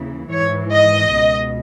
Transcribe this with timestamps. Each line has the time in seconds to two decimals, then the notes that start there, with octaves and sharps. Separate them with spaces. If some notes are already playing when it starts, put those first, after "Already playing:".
Already playing: D#2 C#3 E3
0.30 G#2 E3 C#5
0.72 D#5
1.14 C#2 B2